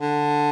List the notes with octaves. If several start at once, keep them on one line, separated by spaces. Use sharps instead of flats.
D3